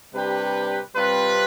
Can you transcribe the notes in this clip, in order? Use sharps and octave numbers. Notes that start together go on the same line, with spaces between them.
C3 G3 D4 G4 B4
C3 G3 C4 F4 B4